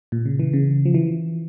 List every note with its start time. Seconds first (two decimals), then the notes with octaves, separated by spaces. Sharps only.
0.12 A#2
0.25 C#3
0.39 E3
0.53 C#3
0.85 F3
0.94 E3